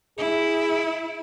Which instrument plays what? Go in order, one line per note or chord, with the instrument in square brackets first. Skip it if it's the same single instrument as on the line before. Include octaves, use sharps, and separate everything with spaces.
[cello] E4 [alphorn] G#4